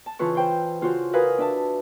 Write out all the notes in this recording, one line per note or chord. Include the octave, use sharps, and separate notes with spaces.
A5
C#3 E3 F4 B4 C#6
C5 G5 C6
C#3 F4 F#4 C5
F#4 A#4 B4 F5 G#5 D#6
D4 E5 A5